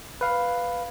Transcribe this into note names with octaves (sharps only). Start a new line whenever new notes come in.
B4 F5